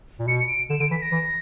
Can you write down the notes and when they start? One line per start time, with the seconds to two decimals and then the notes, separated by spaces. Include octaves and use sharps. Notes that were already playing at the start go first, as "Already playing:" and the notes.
0.19 A#2
0.27 B2 C#7
0.39 C#7
0.48 D7
0.70 D3 E7
0.80 D3 D7
0.91 E3 B6
1.02 A#6
1.12 E3